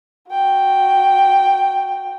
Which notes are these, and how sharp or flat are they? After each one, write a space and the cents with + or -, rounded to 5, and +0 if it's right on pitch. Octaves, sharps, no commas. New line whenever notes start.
F#4 -5 G5 +0